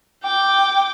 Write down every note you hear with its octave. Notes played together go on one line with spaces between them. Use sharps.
G5 D6